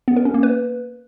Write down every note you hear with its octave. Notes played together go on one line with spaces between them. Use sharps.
B3
A#4
C#4
A#3
B4